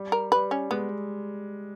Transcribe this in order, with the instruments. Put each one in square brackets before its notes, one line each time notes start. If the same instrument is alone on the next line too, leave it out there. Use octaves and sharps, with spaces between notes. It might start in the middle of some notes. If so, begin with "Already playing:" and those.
Already playing: [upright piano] G3
[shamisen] A#4
[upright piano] G3 [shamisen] B4
[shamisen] C#4
[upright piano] G#3 [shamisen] B3